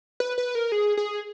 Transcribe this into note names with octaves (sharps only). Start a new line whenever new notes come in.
B4
B4
A#4
G#4
G#4